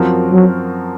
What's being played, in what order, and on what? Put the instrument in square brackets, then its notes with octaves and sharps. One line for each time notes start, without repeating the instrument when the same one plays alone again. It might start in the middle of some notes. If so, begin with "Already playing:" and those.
Already playing: [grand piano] F#2 F3 C4 F#4 A#4
[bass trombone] F#3